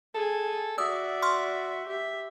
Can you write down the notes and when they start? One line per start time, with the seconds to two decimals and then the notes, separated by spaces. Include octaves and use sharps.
0.15 G#4 A4 G#5
0.78 F#4 D5 E5 D#6 E6
1.22 C6 C#6 F6
1.87 G4 E5